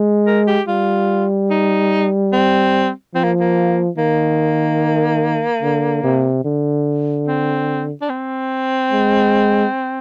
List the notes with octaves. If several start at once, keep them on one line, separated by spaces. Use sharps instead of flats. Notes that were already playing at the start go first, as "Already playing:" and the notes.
Already playing: G#3
A#4
G4
G3 F4
D#4
C4
F3 C4
A#3
A#3
D#3 A#3
D3
C3
D3
C4
D4
C4
G#3